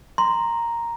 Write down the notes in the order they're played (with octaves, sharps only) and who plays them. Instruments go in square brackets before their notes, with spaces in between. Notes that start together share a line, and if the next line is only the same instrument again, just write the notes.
[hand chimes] A#5 [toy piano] C6